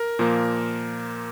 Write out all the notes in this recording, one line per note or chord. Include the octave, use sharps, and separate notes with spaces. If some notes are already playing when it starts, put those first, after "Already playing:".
Already playing: A#4
A#2 F3 A#3